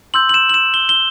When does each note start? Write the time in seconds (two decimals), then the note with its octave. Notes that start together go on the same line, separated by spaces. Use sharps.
0.14 C6 E6 G6 F#7
0.29 F#7
0.34 E7
0.49 F#7
0.54 E7
0.74 G7
0.89 G7